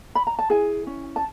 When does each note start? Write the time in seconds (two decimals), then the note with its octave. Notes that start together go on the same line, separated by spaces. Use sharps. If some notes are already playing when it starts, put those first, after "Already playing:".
0.15 B5
0.27 A#5
0.39 A5
0.50 E4 G#4 G#5
0.87 C#4
1.16 A5